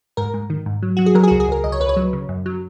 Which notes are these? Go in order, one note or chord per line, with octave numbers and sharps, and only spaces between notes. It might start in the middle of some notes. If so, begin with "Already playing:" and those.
G#2 A#4
G#2
D#3
G#2
F#3
F#3 F#4
G#4
F#3 A#4
G#4
C#2 F#4
G#4
C#2 A#4
C#2 D#5
C#5
C#2 B4
C#5
F#3
C#3
F#2
F#3